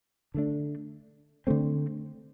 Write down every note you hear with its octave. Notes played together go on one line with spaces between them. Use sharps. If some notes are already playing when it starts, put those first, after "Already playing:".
D3 A3 D4
D3 A3 C4